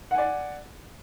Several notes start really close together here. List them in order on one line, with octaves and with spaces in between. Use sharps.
F#5 G#5 D5